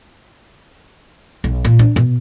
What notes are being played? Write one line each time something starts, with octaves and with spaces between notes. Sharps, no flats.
B1
A#2
D4
B2